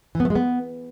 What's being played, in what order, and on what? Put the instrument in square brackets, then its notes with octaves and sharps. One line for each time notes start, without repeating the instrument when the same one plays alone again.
[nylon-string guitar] E3
B3
A3
G#3
B3